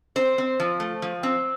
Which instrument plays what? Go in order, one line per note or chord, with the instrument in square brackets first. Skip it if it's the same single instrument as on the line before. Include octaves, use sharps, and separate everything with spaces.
[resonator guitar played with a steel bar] C4 C5
C4
F3
A3
F3
C4